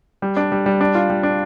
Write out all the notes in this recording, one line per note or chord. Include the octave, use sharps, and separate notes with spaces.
G3
D4
G3
G3
D4
F4
G3
D4